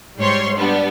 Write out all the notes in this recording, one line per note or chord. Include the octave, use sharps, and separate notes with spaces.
G#2 G3 C#5 C6
G3 B3 D4